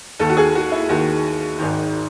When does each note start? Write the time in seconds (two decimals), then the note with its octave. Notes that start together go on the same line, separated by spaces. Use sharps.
0.20 D#2 D#3 A4
0.29 F#4
0.37 G#4
0.55 F#4
0.72 E4
0.89 D#2 D#3 F#4
1.59 G#1 G#2 D#3